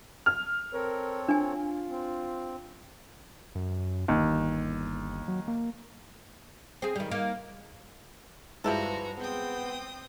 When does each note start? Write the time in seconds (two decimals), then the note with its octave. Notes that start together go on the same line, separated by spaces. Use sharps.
0.26 F6
0.73 C4 A4 A#4 C#5
1.29 D4 F4 G#5
1.90 C4
3.55 F#2
4.08 G1 D#2
5.28 F#3
5.48 A#3
6.82 C4 G#4
6.96 D#3 G3
7.11 A#3 D#4
8.64 G2 F3 G#3 E4 F#4 A4 B4 A#5
9.18 B3 C4 G5 D#6